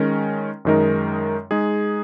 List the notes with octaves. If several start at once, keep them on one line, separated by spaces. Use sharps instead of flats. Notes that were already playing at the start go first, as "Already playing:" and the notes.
Already playing: D#3 G#3 C#4 A#4
F#2 D#3 G#3 D#4 A#4
G#3 D#4 G#4